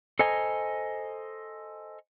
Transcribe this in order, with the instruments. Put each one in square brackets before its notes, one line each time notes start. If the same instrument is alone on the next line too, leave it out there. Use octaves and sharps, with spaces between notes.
[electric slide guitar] A4 C5 D#5 G#5 A#5